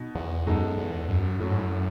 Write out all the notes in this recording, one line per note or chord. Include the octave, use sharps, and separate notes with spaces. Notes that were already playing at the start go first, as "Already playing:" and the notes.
Already playing: B2 D#4
E2
F#2 B2 G#3 D#4 A4
E2
F#2
F#2 F#3 A3 E4
G#2
F#2